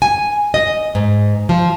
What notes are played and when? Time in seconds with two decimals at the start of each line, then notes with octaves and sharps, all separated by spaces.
0.02 G#5
0.54 D#5
0.95 G#2
1.49 F3